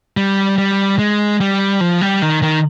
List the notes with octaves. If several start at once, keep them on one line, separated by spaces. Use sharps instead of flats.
G3
G3
G#3
G3
F3
G3
D#3
D#3